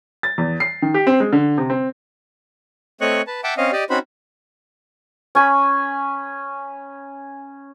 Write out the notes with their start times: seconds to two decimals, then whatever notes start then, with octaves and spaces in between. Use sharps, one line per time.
0.23 A6
0.38 E2
0.60 C7
0.82 D#3
0.94 G4
1.07 C4
1.20 G#3
1.32 D3
1.58 C3
1.70 C4
3.01 A3 C4 C#5 D#5 C#6 F#6
3.27 B4 A5
3.44 E5 F#5 G5 A5 D6
3.57 C4 C#4 D#5 F5
3.72 G4 D5 D#5
3.90 C4 C#4 D#4 F#4 C5 B5
5.35 C#4 G#5 B5